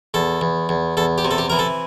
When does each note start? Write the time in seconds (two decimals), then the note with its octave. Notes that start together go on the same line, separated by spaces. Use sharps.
0.14 E2 A4
0.41 E2
0.69 E2
0.97 E2 A4
1.18 G4
1.25 C3
1.31 A4
1.38 G4
1.50 E3 A#4
1.59 A4